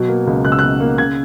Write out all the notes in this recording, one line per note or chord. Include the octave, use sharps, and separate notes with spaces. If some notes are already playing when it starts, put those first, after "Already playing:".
Already playing: B2 F#3
A#3
C#2
C#2 F#6
E6
B2 F#6
A#3
C#3 G#6